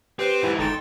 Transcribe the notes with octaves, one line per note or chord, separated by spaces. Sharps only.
C4 G4 B4 C5
G#2 E3 E4
G1 D#4 A4 G5 C6